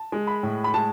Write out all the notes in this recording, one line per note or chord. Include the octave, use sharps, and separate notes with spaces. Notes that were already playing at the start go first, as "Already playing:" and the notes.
Already playing: A5
G#3
B5
A2
B5
G#3 A5